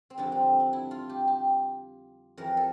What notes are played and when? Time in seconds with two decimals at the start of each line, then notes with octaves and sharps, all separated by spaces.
0.10 C4
0.18 F2 D3 G3 D4
0.32 C4
0.60 D4
0.73 E4
0.91 F4
1.09 G4
1.27 G4
2.37 F2 E3 G3 A#4
2.57 A4